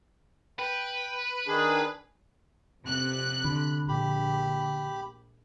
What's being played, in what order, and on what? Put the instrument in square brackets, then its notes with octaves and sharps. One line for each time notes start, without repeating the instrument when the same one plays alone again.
[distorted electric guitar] B4 [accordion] G5
[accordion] D#3 D4 G#4
[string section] F2 C3 F#6
[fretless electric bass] D3 [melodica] B5
[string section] A#1 [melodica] G4 B5